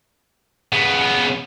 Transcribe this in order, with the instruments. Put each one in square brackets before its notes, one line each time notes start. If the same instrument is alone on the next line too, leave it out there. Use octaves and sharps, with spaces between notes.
[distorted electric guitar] C#3 B3